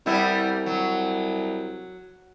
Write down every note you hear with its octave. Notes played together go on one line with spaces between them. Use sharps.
C2 G3 B3 E4
F#3